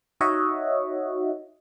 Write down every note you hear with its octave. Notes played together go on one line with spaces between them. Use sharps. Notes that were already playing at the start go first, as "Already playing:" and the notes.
D#4 F#4 C#5 D#5 E5 F#5